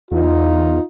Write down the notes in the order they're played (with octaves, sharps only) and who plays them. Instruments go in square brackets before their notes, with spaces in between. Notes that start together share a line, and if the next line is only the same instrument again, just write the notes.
[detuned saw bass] E2 [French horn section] D#4 F4